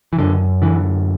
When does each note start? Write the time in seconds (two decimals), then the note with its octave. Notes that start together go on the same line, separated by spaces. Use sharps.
0.13 E3
0.19 F#2 D3
0.62 D3 E3